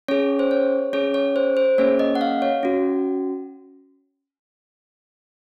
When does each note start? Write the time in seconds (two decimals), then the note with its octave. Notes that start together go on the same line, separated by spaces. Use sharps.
0.08 C#4 G#4 C#5
0.39 C5
0.51 C#5
0.93 C#4 G#4 C#5
1.14 C#5
1.36 C5
1.57 C5
1.78 A#3 C#4 G#4 C#5
1.99 D#5
2.15 F#5
2.21 F5
2.42 C#5
2.63 C#4 F#4